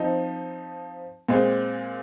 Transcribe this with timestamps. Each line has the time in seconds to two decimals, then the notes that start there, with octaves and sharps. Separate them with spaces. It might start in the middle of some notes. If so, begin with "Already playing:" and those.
Already playing: F3 C4 D#4
1.29 A#2 G#3 C4